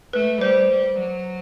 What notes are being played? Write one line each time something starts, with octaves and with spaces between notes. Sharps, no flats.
A3 B4
G3 C5
G3
F#3